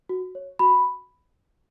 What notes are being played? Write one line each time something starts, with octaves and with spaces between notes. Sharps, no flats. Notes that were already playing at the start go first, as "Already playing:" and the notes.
F#4
C#5
F#4 B5